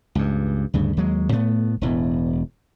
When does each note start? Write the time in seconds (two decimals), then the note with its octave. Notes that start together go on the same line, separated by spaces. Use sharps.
0.15 C#2 G2
0.74 D2 G2 C#3
0.97 D#2 F#3 G#3
1.32 A2 A3 B3
1.81 E1 E2 A2